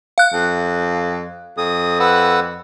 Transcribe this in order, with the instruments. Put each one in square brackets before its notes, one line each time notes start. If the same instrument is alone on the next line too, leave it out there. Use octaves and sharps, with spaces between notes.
[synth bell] F5 F#6
[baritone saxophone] F2
[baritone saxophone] F2 [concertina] D#6
[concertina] B4 F#5 E6